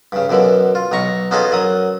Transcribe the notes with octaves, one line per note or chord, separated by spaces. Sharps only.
G2 C#3
F#2 B2 D3 E3
F4
B1 B2 A#5 C#6
B3 C#4 D#4 F4 G#4 A4
F#2 F#3 D#6